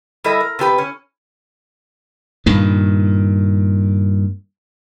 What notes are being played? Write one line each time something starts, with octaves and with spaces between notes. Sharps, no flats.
G3 E4 A4 D#5 E5
A#4
C3 B3 G4 B4
C#4
G2 A#2 D#3